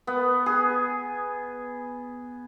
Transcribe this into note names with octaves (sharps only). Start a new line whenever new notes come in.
B3
G#4